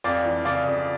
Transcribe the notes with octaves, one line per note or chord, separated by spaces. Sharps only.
F2 D5 F5
E3
C#3 D5 F5
F2